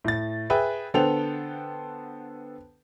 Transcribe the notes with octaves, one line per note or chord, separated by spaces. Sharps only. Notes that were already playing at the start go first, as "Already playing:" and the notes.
A2 A6
G#4 B4 E5 G5
D3 B3 A4 C5 G5 F7